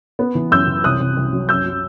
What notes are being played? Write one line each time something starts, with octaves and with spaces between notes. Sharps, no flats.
B3
E3
F#2 E6 G6
E3
C2 D#6 F#6
C2
C2
F#3
F#2 E6 G6
F#3